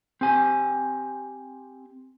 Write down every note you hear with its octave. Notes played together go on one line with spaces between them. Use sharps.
C4 G4 G#5